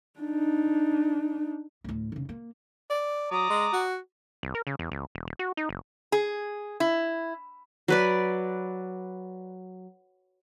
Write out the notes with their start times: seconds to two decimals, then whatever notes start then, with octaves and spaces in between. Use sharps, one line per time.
0.20 D4 D#4
1.84 D2 A2
2.12 F1 C#3
2.29 A#3
2.90 D5
3.31 F#3 D5 A#5 D#6
3.50 G#3
3.73 F#4
4.43 C2
4.55 A#4
4.67 C#3
4.79 E2
4.92 C#2
5.15 E1
5.27 D#1
5.39 F#4
5.57 D#4
5.69 F#1
6.12 G#4
6.80 E4
7.88 F#3 B4 D5